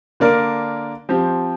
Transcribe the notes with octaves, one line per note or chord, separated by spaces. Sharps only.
D3 A#3 D4 A#4 D5
F3 C4 G4